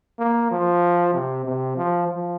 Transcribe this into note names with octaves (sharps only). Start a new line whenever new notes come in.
A#3
F3
C3
C3
F3
F3